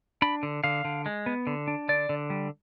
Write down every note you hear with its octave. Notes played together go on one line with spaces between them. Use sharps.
D4 B5
D3
D3 F5
D3
G#3
B3
D3
D4
D3 D5
D3
G3